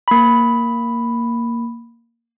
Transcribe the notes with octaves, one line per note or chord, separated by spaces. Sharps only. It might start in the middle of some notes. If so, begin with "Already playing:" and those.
A#3 B5